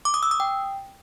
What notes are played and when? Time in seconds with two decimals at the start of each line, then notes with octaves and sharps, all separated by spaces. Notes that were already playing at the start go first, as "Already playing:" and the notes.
0.05 D6
0.14 D#6
0.23 E6
0.31 D#6
0.40 G5